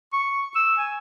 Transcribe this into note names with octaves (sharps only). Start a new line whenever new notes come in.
C#6
E6
G#5